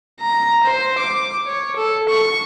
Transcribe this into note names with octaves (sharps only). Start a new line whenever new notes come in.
A#5
C5
D6
C#5
A4
C#6